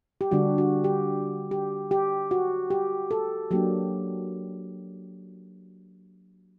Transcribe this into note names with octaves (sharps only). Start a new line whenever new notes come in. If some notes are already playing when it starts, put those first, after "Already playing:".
G4
D3 G3 D4 F#4
F#4
G4
G4
G4
F#4
G4
A4
F#3 A#3 D4 G4